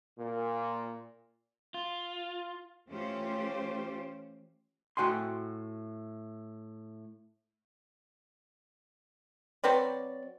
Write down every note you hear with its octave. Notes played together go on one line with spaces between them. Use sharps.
A#2
F4
E3 A3 C#4 F4 G4 C5
A2 F#4 G5 G#5 C6
F#3 C4 B4 D5